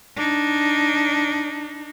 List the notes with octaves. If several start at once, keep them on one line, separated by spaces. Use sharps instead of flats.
D4 D#4